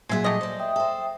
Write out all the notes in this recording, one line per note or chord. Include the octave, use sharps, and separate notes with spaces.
A#2 F#3 G#3 G#4 E5
A3 G4 D#5
C5 D5
E5 G5 D#6
A4 C5